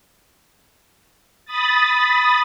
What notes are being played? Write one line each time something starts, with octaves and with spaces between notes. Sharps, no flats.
B5 D#6 A6